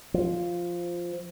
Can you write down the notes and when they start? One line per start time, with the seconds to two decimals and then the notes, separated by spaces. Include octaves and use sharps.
0.14 F3